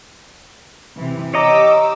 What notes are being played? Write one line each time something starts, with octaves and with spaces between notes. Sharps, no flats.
C3 E3
G4 C#5 D#5 A#5 D6 E6